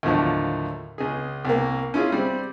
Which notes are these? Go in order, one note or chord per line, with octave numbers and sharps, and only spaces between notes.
D#2 A2 D3 F3 F#3 A5
C#2 G#4
C2 A#3
C#4 E4 F4 G#4
G3 C4